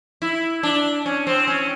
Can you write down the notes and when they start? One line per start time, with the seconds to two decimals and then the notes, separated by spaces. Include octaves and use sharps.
0.22 E4
0.63 D4
1.06 C#4
1.27 C4
1.47 C#4